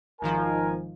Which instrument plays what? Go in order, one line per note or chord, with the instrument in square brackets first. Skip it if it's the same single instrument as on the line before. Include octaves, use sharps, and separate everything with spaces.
[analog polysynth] G#1 D#3 F3 [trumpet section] A#4 G#5